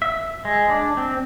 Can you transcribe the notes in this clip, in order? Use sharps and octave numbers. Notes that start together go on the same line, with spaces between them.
E5
G#3
D4
C4